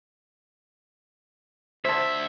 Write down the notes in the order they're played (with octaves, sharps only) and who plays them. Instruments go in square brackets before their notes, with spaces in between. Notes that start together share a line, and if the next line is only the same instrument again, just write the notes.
[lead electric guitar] D2 E5 [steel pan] C5 A5